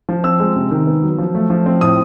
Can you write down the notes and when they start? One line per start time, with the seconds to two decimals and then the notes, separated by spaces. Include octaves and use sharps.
0.09 F3
0.24 C4 E6
0.40 G#3
0.56 C3
0.71 D#3
0.87 B3
1.03 F#3
1.18 F3
1.35 A3
1.50 F3
1.66 C4
1.81 A2 D#6